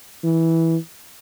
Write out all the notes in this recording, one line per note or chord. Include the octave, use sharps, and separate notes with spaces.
E3